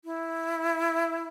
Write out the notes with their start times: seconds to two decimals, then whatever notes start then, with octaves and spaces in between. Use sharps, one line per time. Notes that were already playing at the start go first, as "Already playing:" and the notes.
0.05 E4